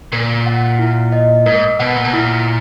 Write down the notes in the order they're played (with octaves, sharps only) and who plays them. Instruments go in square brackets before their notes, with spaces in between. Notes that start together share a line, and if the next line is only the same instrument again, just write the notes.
[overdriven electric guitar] A#2 [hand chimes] A#4
[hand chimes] F#5
E4
D#5
[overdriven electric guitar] G#2 [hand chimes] A#4
[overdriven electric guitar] B2 [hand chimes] F#5
[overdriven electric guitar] A#2
B2
[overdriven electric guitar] A#2 [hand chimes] E4